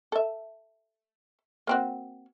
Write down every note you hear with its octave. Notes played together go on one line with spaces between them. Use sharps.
A4 E5
A#3 C4 F#4